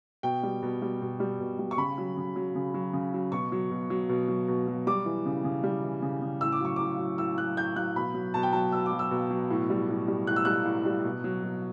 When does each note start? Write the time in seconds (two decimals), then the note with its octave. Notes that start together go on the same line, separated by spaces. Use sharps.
0.23 B2 G5
0.43 G3
0.63 B2
0.82 G3
1.01 B2
1.20 G3
1.40 B2
1.59 G3
1.71 C#6
1.77 C#3 B5
1.98 F#3
2.17 C#3
2.36 F#3
2.55 C#3
2.74 F#3
2.93 C#3
3.14 F#3
3.32 B2 C#6
3.52 F#3
3.71 B2
3.90 F#3
4.09 B2
4.28 F#3
4.48 B2
4.68 F#3
4.87 G3 D6
5.06 E3
5.26 C#3
5.44 C#3
5.64 G3
5.83 E3
6.02 C#3
6.22 C#3
6.41 A2 E6
6.52 D6
6.60 F#3 C#6
6.76 A2 D6
6.99 F#3
7.18 A2 E6
7.38 F#3 F#6
7.57 A2 G6
7.76 F#3 F#6
7.96 B2 B5
8.14 F#3
8.34 B2 A5
8.43 G5
8.53 F#3 A5
8.72 B2 E6
8.86 D6
8.92 F#3
8.99 E6
9.11 B2
9.31 F#3
9.50 A2
9.70 G3
9.88 A2
10.08 G3
10.27 A2 F#6
10.36 E6
10.45 G3 F#6
10.65 A2
10.86 G3
11.04 B2
11.24 F#3
11.43 B2